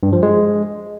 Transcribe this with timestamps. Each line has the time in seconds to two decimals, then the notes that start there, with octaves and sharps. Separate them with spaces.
0.03 G2
0.13 F3
0.23 G#3